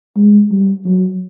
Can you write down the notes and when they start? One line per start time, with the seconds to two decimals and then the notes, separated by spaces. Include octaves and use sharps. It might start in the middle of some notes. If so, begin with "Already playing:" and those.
0.16 G#3
0.51 G3
0.85 F#3